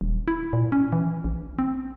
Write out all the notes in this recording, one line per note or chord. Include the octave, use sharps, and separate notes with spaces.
D#1
E4
A#2
C#4
E3
A#1
C4